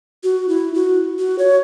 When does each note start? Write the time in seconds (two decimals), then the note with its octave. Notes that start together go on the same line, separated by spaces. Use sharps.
0.23 F#4
0.49 E4
0.74 F#4
1.19 F#4
1.39 C#5